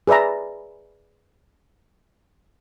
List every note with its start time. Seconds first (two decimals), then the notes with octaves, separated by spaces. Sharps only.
0.07 G#4 B4 D5 E5 A#5